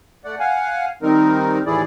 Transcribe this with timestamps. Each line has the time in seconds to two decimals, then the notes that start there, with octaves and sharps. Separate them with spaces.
0.25 A3 D5 F#5
0.39 F5 F#5 G#5
1.02 D#3 G3 C4 D#4 A#4
1.66 D#2 A2 E3 E4 G#4 D5